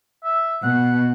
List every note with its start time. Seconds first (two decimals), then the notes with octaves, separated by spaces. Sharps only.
0.24 E5
0.63 B2 F#5